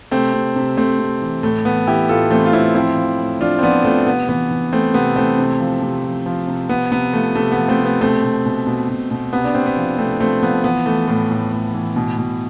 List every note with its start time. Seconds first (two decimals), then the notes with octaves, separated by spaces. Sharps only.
0.11 C3 A3 C4
0.34 C3
0.56 C3
0.77 C3 A3 C4
0.99 C3
1.21 E3
1.43 A2 A3
1.65 E3 B3
1.87 E3 E4 G4
2.09 A2 F4 A4
2.30 E3 A3 C4
2.45 F4
2.53 A2 C4 E4
2.75 F3 C4 E4
2.97 F3
3.19 A2
3.40 F3 D4 F4
3.59 C4
3.62 F3 B3 D4
3.85 F3 A3 C4
4.06 C3 B3
4.29 E3 B3
4.50 E3
4.72 E3 A3 C4
4.94 C3 B3
5.16 E3 A3 C4
5.38 C3
5.60 F3
5.82 C3
6.04 F3
6.26 F3
6.47 C3
6.69 C3 B3
6.91 C3 B3
7.13 F3 A3
7.35 C3 A3
7.52 B3
7.58 F3
7.68 A3 C4
7.79 C3
7.85 B3
8.01 B2 A3 C4
8.23 B2
8.46 B2
8.67 B2
8.89 B2
9.11 B2
9.33 C3 B3
9.44 D4
9.54 C3 C4
9.66 B3
9.77 F3
9.98 C3 A3 C4
10.20 F3 A3 C4
10.42 F3 B3
10.64 E3 B3
10.86 E3 A3
11.08 A2 A3
11.31 A2
11.52 A2
11.74 E3
11.96 B2
12.18 B2